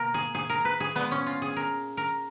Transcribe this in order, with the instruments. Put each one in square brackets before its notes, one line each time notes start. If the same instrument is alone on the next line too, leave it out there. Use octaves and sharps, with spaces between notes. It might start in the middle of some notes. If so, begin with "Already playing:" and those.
Already playing: [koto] B2 A#3 A#4
G#4
G#4
A#4
B4
G#4
A#2 G#3 B3
C#4
F4
G#4
A#4
A#4